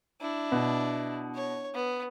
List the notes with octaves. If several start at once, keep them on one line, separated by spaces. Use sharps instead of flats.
D4 E4
B2
C#5
B3